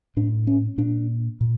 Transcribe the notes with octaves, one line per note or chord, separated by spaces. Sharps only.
A2 D4
C#4
A#2 D4
A#2